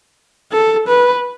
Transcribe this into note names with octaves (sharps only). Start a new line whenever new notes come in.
A4
B4